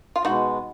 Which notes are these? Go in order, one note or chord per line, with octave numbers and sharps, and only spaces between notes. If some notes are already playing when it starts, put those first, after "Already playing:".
F4
B2 G#3 B3 D#4 F#4